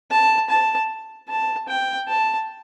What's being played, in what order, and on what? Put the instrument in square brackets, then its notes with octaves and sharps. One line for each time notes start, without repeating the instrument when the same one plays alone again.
[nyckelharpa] A5
A5
A5
G5
A5